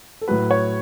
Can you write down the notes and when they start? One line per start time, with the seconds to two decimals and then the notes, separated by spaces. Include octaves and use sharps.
0.21 A4
0.28 A2 F#3 B4
0.51 C#5